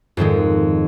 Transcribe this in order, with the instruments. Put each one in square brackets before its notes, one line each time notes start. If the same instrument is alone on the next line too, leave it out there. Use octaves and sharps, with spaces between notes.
[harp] F2 G#2 D#3 G#3